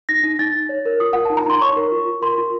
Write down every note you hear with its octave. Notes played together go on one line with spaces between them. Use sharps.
D#4 A#6
D#4
D#4 A6
D#4
C#5
A#4
F4 D#6
A#4 F#5
D#4 A5
A#5
D#4 C6
C#5 C#6
A#4
F4
F4
A#4 C6
F4